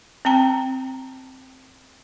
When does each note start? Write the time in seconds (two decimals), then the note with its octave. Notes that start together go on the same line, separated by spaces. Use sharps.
0.25 C4 G5 A5 A#5